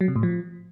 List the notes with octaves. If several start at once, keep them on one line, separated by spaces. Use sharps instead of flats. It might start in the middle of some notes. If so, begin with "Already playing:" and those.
F#3
C3
A2
F3